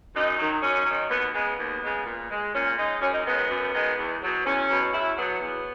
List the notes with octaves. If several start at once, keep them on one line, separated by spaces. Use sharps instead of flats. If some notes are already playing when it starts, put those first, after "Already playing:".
F#2 D#4
D#3 F#3
F#2 C#4
D#3 F#3
D#2 B3
C#3 G#3 B3
D#2
C#3 G#3
A#2
G#3
A#2 C#4
G#3 D#4
F#2 C#4
D#4
D#3 G#3 B3
B3
F#2
D#3 G#3
E2
B2 F#3
E2 C#4
B2 F#3
E2 E4
B2 F#3 B3
E2